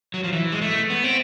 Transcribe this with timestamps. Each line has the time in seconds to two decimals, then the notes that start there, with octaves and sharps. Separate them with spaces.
0.14 F#3
0.24 F3
0.32 E3
0.52 G#3
0.62 A3
0.90 B3
1.04 C4